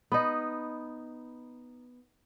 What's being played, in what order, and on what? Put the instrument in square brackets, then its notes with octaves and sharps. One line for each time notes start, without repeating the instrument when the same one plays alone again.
[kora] B3 D#4